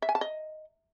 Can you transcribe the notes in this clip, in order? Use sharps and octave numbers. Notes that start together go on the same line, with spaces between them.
E5
G#5
A5
D#5